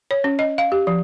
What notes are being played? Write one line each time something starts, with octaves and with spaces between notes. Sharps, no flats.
C#5
C#4
D#5
F5
G4
F3